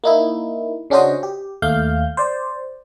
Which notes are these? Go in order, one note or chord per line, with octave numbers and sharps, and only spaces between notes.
A#3 D#4 E4
C#3 C#4 D4 F#4 C5 D#5
G4
D#2 A3 F5 F6 G6
C5 D5